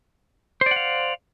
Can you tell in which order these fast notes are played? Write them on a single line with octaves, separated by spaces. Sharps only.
C5 D5 F#5 F5